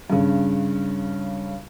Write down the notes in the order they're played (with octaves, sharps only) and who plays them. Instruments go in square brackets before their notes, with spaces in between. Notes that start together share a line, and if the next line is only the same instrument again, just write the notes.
[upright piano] G2 C#3